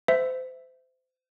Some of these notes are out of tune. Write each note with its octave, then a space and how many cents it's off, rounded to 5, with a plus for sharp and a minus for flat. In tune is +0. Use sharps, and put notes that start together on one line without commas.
C5 -30 E5 +0